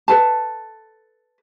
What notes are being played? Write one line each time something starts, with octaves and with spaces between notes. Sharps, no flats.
A4 B4 A5